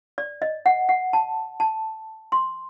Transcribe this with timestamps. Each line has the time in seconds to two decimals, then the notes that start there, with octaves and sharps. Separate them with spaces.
0.18 D5
0.42 D#5
0.66 F#5
0.89 F#5
1.13 A5
1.60 A5
2.32 C6